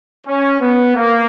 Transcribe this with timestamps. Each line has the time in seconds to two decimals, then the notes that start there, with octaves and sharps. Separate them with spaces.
0.27 C#4
0.61 B3
0.95 A#3